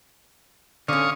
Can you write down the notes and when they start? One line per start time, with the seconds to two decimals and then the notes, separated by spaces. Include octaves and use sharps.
0.88 D3 C#4 F5 C#6 D#6